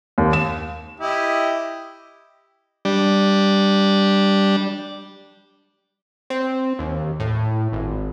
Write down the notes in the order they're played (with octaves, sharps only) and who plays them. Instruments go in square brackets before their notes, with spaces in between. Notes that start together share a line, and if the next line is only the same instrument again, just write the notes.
[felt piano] D#2
E7
[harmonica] E4 G4 D#5
[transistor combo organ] G3 D4
[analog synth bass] C4
D#2
A2
G#1